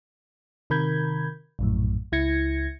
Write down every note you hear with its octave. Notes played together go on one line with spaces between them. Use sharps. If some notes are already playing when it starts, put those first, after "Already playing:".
C3 D#3 A#4 B5 G6 G#6
A#1 F#2 A2
C#2 E4 G#6 A#6 C#7